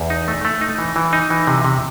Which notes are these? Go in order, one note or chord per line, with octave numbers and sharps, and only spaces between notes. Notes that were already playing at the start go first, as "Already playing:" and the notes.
Already playing: E2
D#4
A3
A3
D#4
E3
E3
D#4
E3
C3
C3